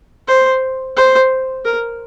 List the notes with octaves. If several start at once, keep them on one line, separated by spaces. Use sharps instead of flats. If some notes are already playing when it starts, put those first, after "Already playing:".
C5
C5
A#4